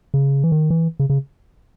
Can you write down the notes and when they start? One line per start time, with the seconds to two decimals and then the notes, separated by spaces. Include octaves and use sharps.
0.14 C#3
0.44 E3
0.52 D#3
0.70 E3
1.00 C#3
1.10 C#3